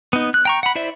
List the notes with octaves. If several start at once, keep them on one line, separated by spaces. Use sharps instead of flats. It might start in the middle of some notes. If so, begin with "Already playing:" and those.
B3 D#4
F#6
G5 A#5 C#6
F#5 B5
E4 C5 D5 E5